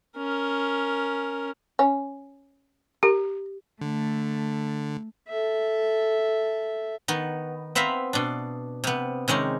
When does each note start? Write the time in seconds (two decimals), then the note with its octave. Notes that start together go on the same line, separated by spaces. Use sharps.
0.17 C#4 A#4
1.79 C#4
3.03 G4 A#4
3.81 D3 A3
5.28 A4 E5
7.08 D#3 B3
7.75 B3 C4 E5 F5 A#5 B5
8.13 B2 D4
8.84 C3 B3
9.28 C3 D#3 G#3 C#4